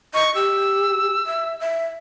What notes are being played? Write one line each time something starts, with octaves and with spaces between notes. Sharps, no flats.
D#5 C#6
G4 E6
E5
E5